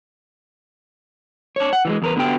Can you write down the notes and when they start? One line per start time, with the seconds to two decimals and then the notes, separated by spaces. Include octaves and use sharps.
1.56 D4 C#5
1.73 F#5
1.85 E3 G3 G#3
2.02 E2 A#4 B4
2.16 D3 B3 F#4 G4 B4 G5